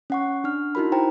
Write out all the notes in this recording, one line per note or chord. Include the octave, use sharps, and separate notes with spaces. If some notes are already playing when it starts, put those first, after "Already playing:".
C#4 F#5 C#6
D4 F6
D#4 E4 F#4 A#4 B5
D#4 C5 G5 A#5